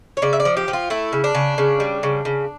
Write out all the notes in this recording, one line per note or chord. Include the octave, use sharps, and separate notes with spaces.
C#5
C#3 D5
E5
D5
F3
G4
F3
F4
A3 E4
C#3
D4
C#3
C#3
G3
C#3
C#3